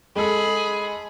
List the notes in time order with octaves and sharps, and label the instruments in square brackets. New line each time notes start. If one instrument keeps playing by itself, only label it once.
[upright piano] G#3 A4 [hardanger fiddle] G#4 B5